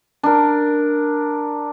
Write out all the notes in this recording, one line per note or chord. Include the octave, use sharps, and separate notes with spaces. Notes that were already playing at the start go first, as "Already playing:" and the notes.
D4 A#4